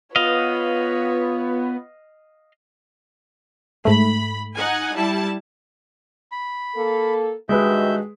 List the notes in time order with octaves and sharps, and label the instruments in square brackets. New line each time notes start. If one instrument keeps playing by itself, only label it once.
[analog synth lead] B3 [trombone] F4 [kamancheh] B4 C#5 [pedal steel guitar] D#5 F5
[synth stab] G#2 A3 [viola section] B5
[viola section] D#4 F#5 G#5
G3 E4 A5
[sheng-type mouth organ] B5
[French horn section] A#3 A4
[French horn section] G2 D#3 F#4 [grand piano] G#3 G#4 B4 [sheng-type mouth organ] E5 G6